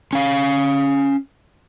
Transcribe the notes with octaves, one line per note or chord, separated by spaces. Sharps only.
C#4 F5